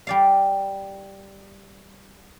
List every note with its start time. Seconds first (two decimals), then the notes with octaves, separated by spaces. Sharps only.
0.07 G3 D5 F5